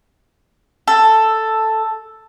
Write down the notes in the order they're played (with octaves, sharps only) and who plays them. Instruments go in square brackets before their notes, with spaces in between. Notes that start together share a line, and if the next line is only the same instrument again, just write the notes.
[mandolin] A4